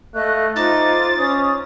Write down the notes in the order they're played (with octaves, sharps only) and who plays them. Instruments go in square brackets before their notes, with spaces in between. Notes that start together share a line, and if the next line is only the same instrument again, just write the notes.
[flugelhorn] A3 [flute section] D#5 F5 F#6
[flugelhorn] D#4 [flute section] F4 C5 D6 [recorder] A6
[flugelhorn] C#4 [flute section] C5 D#6